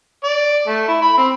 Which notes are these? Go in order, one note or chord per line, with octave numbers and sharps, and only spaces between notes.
D5
A3
E4
B5
C4